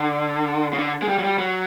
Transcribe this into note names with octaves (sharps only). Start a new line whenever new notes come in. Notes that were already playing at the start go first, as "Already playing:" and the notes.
Already playing: D3
C#3
D3
G#3
G3
F#3
G3
F#3